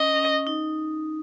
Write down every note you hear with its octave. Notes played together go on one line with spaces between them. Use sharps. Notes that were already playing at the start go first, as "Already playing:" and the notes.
Already playing: C#4 D#5
C#4
D#4